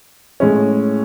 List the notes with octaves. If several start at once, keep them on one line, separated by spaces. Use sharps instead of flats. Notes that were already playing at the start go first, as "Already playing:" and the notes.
A2 G#3 C#4